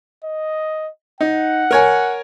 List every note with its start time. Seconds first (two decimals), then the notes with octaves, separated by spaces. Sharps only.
0.24 D#5
1.21 D#4 F#5
1.71 A#4 C#5 G#5